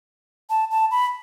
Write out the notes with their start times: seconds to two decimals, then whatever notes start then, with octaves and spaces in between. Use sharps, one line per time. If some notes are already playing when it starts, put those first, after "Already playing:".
0.50 A5
0.71 A5
0.91 B5